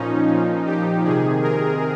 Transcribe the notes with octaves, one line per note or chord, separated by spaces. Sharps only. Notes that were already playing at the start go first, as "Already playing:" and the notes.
Already playing: A#2 F3 C#4 D#4
A#2 F3
G4
C3 D#3 G#4
A#4